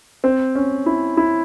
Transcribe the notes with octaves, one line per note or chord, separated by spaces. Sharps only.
C4
C#4
E4
E4